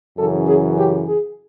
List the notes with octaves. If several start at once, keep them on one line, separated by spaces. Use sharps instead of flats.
F#2 C#3 E3 A4
G#4
G4
G#4